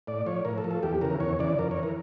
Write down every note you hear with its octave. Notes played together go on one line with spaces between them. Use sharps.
A2 D5
F3 C#5
A2 A#4
A4
F3
A4
E2 G4
C#3 E3 A#4
E2 C#5
C#3 E3 D5
F2 A#4
C#5
E3
A#4